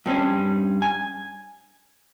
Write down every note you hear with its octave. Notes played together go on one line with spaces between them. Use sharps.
G2 G3 C4 C#4
G#5